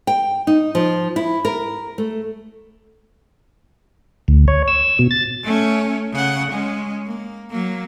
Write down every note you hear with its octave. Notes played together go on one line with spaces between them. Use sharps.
G5
D#4
F3
E4
A#4
A3
D2
C#5
E6
B2
A6
A3 C#4
C#3 F#5
G#3 C#4
A#3
F#3 A#3